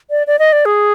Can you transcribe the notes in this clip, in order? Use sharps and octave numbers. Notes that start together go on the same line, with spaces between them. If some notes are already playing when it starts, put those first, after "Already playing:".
D5
D5
D#5
D5
G#4